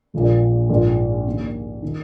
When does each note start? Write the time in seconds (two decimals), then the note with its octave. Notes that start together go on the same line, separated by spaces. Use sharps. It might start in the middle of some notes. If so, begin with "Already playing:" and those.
0.14 A#1 A#2 F3 G#3
0.69 A#1 G#2 F3 A#3 F4
1.26 D#2 C#3 A#3
1.82 D#3